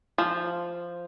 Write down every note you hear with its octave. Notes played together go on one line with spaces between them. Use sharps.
F3